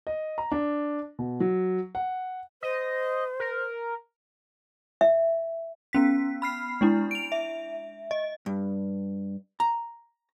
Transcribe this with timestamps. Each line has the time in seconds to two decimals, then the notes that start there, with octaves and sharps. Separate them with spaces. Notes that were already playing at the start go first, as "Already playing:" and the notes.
0.07 D#5
0.38 A#5
0.51 D4
1.19 B2
1.40 F#3
1.95 F#5
2.63 C5 D#5
3.40 A#4
5.01 E5
5.93 B3 C#4 B6
6.42 B5 F6 C7
6.81 G#3 D4 E4
7.11 D7 F7
7.32 E5
8.11 D#5
8.46 G2
9.60 A#5